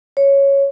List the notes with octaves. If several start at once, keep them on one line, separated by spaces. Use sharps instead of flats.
C#5